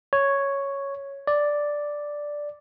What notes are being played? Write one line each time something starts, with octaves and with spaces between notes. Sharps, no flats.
C#5
D5